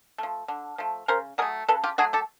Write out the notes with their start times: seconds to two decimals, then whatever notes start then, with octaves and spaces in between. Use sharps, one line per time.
0.18 F3 A3
0.48 D3
0.78 F3 A3
1.08 C#3 A#4 C5
1.38 F#3 G#4 A#4
1.42 A3
1.68 C#3 A4 B4
1.84 F4 G4
1.98 F#3 A3 F#4 G#4
2.13 G4 A4